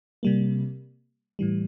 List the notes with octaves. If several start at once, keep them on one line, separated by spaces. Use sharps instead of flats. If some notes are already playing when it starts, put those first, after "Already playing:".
C3 G3 A#3
A2 E3 G3